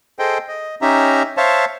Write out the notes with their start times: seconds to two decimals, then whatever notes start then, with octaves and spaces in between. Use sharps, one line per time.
0.19 G#4 A4 C5 D#5 G5
0.48 D#5
0.82 C#4 D#4 G4 E5 A#5
1.37 C5 C#5 E5 F5 A5